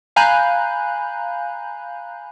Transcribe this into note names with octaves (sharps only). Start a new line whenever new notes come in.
F5 G#5 A#5 B5 F#6 G6